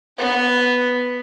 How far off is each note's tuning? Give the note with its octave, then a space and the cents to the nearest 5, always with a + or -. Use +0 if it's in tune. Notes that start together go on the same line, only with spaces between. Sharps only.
B3 +0 B4 +0